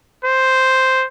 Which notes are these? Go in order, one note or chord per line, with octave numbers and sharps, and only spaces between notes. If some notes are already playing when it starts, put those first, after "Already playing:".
C5